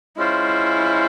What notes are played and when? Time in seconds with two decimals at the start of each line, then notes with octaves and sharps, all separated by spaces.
0.17 G#3 C#4 E4 F4 C5